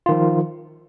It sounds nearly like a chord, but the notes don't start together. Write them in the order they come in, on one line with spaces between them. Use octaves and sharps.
F4 D#3 F3